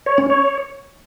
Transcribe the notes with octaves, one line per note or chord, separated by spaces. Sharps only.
C#5
C#4
C#5